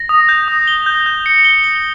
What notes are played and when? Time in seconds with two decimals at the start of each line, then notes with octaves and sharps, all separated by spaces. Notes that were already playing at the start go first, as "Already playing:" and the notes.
Already playing: A#6
0.09 D#6
0.29 G6
0.48 D#6
0.67 G7
0.86 G6
1.06 G6
1.26 C#7
1.45 G7
1.64 G7